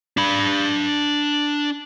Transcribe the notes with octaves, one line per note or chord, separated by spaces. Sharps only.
D4 B5